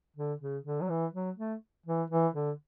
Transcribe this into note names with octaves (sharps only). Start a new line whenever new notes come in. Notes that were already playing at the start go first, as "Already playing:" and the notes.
D3
C#3
D3
F#3
E3
F#3
A3
E3
E3
D3